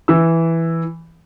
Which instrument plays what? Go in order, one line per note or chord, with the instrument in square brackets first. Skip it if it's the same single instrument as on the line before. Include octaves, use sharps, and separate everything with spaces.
[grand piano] E3 E6